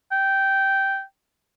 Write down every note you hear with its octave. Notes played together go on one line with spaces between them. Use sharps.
G5